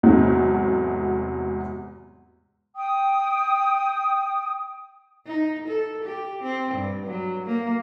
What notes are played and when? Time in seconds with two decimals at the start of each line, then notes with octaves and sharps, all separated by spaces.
0.03 E2 G#2 C3 F#3 A3
2.75 G5 D#6
5.26 D#4
5.68 A4
6.04 G4
6.43 C4
6.74 G2
7.06 F#3
7.47 A#3